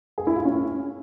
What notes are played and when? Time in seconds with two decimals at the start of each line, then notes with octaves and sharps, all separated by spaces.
0.18 G#4
0.27 E4
0.36 F4
0.45 C#4